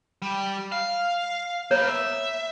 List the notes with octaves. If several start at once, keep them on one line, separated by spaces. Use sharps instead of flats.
G3
F5
A#3 B3 C#5
E5